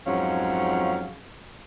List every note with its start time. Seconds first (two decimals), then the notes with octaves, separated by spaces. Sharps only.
0.06 F2 G#2 F#3 C#4 F5